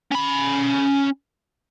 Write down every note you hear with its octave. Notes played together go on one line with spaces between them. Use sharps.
C#4 B5